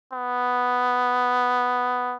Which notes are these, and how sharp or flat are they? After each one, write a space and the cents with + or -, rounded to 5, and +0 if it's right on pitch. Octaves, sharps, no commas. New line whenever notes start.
B3 +5